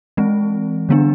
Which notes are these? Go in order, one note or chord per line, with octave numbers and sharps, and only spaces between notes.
E3 G#3 C4
D3 G3 B3 D4